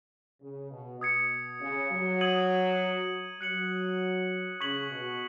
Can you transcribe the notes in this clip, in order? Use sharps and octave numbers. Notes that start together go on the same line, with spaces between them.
C#3
B2
B2 D#6 G#6 C#7
C#3
F#3
D#6 G#6 D#7 F#7
F#3 F#6 C#7 F#7
C#3 C#6 G#6 B6 F#7
B2